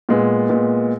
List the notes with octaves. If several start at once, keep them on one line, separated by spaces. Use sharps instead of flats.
A#2 G#3 B3
A#2 G#3 B3